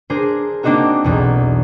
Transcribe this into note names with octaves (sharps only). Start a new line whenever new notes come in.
D4 G#4 A#4 C5
A#3 C4 D4 D#4 F#4 A#4
B1 E2